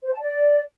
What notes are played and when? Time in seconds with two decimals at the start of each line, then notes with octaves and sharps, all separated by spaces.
0.05 C5
0.12 A5
0.20 D5